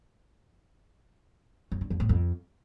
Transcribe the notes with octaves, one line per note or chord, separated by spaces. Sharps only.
F#2
D3
F2
A2
F2